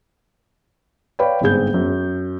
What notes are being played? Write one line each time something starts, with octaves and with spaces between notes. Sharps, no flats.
B4 C#5 D5 F5 G5 B5
G1 G#2 C4 G#4 G6
F#2